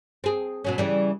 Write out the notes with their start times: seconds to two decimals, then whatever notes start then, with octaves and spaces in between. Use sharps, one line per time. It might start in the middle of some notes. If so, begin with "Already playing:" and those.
0.24 C4 G#4
0.64 B2 F#3 C#4
0.78 C#3 E3 G3